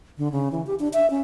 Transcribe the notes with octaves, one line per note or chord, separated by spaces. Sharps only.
D3
C#3
E3
G4
D4
E5
C#4